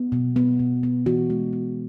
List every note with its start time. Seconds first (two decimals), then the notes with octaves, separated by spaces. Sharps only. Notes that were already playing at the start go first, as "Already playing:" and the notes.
Already playing: B3
0.12 B2
0.36 B3
0.59 B2
0.83 B3
1.06 E3 F#4
1.30 G#3
1.53 B3